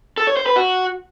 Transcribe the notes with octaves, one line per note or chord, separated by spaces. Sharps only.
A4
C#5
C5
B4
F#4